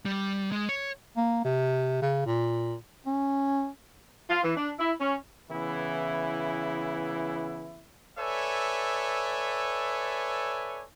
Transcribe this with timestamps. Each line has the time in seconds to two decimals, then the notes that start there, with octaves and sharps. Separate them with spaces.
0.05 G3
0.52 G#3
0.69 C#5
1.17 A#3
1.44 C3
2.02 C#3
2.26 A#2
3.06 C#4
4.30 F4
4.43 E3
4.57 D4
4.79 E4
4.99 C#4
5.51 C#3 E3 B3 E4
8.18 A4 B4 C#5 D5 E5 G#5